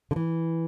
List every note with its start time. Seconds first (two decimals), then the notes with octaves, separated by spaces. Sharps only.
0.11 D3
0.16 E3